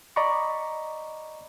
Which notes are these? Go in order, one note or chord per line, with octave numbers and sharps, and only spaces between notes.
D5 D#5 A#5 B5 C#6